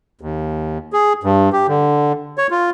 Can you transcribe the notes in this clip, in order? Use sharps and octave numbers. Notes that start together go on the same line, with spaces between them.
D#2
G#4
G2
G4
D3
C#5
F4